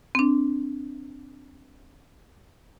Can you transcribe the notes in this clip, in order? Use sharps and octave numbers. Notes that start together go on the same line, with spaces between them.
C4 D4